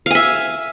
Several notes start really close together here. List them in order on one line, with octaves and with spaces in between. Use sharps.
F5 G#5 E5